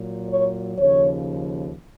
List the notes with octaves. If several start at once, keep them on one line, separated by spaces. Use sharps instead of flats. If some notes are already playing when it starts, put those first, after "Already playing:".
Already playing: A#2 F#3
C#5
D#2 C#3 F3 C#5